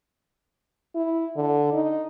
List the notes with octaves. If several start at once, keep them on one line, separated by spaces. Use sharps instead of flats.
E4
D3
D#4